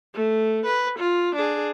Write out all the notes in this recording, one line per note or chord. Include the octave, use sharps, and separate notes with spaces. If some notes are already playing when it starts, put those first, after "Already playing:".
A3
B4
F4
D4 G#4